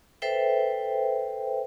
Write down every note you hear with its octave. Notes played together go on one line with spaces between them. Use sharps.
A4 B4 C5 E5 G5